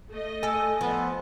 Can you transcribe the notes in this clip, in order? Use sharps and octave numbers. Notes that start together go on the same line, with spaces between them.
A3 D#5
A4 G#5 E6
F3 B3